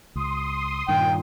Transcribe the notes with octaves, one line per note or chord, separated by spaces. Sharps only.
C#2 C6 D#6
G2 A#2 D#3 G5